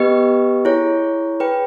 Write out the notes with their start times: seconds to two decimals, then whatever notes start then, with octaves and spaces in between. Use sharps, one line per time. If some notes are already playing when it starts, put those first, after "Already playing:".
Already playing: B3 G4 B4 D#5
0.65 E4 G#4 C#5
1.40 G#4 B4 G5